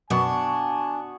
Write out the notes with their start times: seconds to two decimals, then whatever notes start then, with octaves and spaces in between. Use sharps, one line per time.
0.10 F#2 B2 B3 D4 F#4 G#5 C#6